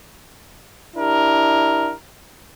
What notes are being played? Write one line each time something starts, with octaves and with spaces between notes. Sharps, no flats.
D4 E4 G4 A#4